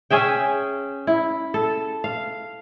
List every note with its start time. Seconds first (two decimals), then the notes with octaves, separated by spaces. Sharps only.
0.10 C#4 G#4 E5 G5
1.07 E4
1.54 A4
2.04 F5